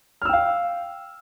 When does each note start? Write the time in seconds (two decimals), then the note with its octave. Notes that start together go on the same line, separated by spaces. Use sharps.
0.22 F6
0.25 E6
0.29 G5
0.33 F5